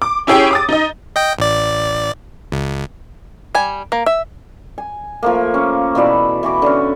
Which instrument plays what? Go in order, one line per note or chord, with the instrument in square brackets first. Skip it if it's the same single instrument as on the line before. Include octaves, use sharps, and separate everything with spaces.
[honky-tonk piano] D6
C#4 E4 G4 G#4 C#5 G5
D6 D#6 A6
D#4 D#5
[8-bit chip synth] D#5 G5
A1 D5
C#2
[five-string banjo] G3 G#5
A#3
E5
[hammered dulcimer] G#5
F3 A3 A#3
C#4
B2 E3 D5 E5
E3 F#4 D6
D3 C#4